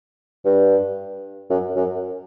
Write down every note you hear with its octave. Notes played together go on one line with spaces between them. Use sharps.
G2
F#2
F#2